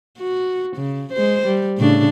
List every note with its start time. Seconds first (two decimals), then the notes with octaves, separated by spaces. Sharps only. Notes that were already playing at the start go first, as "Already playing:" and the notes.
0.18 F#4
0.77 C#3
1.13 G#3 C5
1.47 G3
1.78 A2 C#3 D4